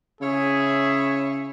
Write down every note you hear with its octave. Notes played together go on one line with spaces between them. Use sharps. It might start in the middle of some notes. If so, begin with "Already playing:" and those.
C#3 E4 G#4 C#5 E5